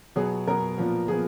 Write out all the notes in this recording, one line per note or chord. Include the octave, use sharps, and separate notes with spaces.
B2 F#3 B3 G#4
B2 F#3 B3 A#4
A#2 F3 B3
A#2 F3 B3 G#4